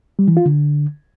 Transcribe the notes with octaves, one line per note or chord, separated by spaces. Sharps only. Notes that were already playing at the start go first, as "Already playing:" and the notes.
G3
E3
F4
D3